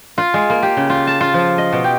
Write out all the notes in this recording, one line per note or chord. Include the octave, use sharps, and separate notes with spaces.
F4
G#3
A#3
G4
C#3
F4
A5
F4
F3
D#5
B2
G4